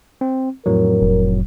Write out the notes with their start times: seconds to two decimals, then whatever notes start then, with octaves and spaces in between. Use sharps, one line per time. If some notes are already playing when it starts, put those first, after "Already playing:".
0.21 C4
0.66 F2 A2 F#3 A#4
1.02 F1